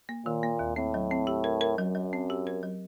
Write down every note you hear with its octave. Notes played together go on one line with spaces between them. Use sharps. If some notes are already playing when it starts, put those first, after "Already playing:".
A#3
A#2 D#3
A#3
D#2
A2 C4
F#3
C4
G4
A#4
A#4
F#2 F#3
F#3
C4
G4
A#4
F#3